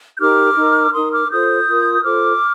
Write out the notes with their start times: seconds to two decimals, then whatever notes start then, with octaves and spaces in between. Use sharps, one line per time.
0.16 G6
0.20 D#4 G4 A#4 D6 F6
0.56 D#4 A#4
0.93 D#4 A#4 C6 D#6
1.12 D6 F6
1.30 F4 A4 C5 D#6 G6
1.67 F4 A#4
1.95 G6
2.04 F4 A4 C5 D6 F6